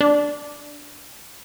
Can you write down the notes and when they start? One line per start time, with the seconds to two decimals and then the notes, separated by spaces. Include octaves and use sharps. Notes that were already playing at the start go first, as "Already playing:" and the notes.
0.01 D4